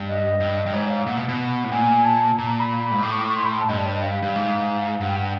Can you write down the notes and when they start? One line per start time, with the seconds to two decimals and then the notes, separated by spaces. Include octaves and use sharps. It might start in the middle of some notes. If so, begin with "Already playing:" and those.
Already playing: G2
0.08 D#5
0.40 G2
0.66 G2
0.73 G#2 C#5
0.89 F5
1.06 A#2 F#5
1.17 B2
1.28 B2
1.64 A2
1.71 A#2 G#5
2.04 A5
2.37 A#2 A#5
2.49 A#5
2.59 B5
2.92 G#2
3.03 A2 D6
3.12 C#6
3.20 D6
3.28 C#6
3.36 C6
3.45 B5
3.52 C6
3.61 A5
3.69 G2 D#5
3.78 D5
3.86 C#5
3.94 D#5
4.02 F5
4.22 G2
4.35 G#2
5.00 G2 F#5
5.09 G5
5.17 F#5